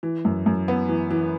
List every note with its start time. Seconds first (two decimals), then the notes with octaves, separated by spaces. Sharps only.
0.03 E3
0.25 F#2
0.46 F#2
0.68 B3
0.89 E3
1.11 E3